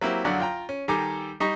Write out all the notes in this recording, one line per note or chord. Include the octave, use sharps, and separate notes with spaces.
F#3 A#3 C4 E4 G4
A#1 F#2 D3 F#3 D5 F#5
F4 G5 A#5
C#4
D#3 G3 A4 G#5 A#5 D6
G3 D#4 D#5 A#5 C#6